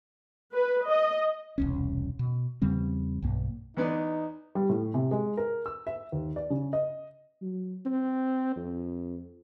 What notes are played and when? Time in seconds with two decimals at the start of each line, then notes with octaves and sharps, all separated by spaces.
0.53 B4
0.89 D#5
1.58 E1 C2 C#4
2.19 B2
2.62 E2 C#3 G3 C4
3.22 B1 G2 A#3
3.77 E2 B3 D#4 D5
4.55 G3
4.69 A2
4.94 C3
5.11 G#3
5.37 A#4
5.66 E6
5.87 E5
6.12 D#2
6.36 D5
6.50 C#3
6.73 D#5
7.41 F#3
7.85 C4
8.56 F2